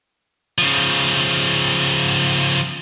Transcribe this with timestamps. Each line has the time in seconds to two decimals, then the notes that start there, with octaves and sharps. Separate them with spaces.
0.58 C#3 F3